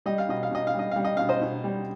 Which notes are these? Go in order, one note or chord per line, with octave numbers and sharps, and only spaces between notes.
G3 D#5
F5
B2 D#5
F5
B2 D#5
F5
G3
D#5
G3 F5
D#5
B2 F5
C5 D#5
B2
G3